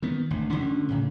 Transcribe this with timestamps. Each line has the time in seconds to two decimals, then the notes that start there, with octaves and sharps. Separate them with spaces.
0.03 D#3 B3
0.31 G#1 D2
0.50 D2 D3 C#4
0.89 A2 C#3